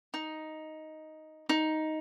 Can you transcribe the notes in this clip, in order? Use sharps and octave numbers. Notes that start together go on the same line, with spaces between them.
D#4
D#4